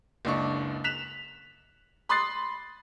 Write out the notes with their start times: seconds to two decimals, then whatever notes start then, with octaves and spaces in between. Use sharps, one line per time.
0.25 F#1 C#2 D4 C#6
0.84 F#6 B6 E7 F7
2.09 B5 C6 D#6 F#6 A6 C7